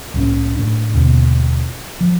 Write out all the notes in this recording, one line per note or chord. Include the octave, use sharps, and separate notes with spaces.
C2 A2 C#4
A2 D4
D#2 B2 D3
F3